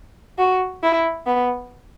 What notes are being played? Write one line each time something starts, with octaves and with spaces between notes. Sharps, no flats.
F#4
E4
B3